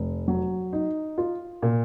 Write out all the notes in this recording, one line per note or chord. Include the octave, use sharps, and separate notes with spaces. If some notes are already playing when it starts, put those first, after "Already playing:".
Already playing: F1
F#3
D#4
F4
A#2